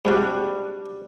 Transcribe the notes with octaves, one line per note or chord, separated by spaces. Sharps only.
G#2 C3 G3 D4 F#4 F#5